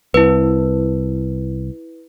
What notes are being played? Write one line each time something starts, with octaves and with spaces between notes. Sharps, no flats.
C2 E4 B4